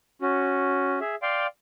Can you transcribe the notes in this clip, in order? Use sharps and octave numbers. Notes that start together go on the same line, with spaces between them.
C#4 F#4
G#4 E5
D5 F5 G5 C6